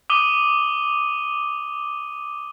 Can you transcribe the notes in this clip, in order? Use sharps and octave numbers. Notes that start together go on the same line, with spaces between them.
D6 D#6 D#7 G7